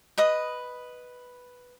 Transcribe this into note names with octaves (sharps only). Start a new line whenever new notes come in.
B4 D#5 D#6